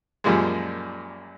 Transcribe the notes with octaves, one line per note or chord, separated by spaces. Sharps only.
F#2 A#2 F3 G3 G#3